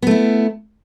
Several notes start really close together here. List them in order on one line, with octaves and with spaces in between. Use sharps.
B3 A3 E4